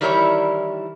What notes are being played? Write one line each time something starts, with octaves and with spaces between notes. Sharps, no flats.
D#3 E3 G3 E4 A#4 C#5